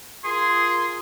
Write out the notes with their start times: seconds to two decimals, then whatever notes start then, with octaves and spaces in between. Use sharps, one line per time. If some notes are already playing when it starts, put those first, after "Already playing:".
0.24 F4 G#4 A#4 C6